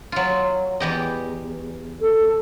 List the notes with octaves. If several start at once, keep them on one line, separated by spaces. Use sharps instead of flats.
F#3 F4
E2 G4 D#5
A4